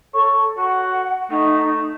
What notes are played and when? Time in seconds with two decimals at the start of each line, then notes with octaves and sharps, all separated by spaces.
0.14 A4 C#5
0.58 F#4 F#5
1.31 A3 D#4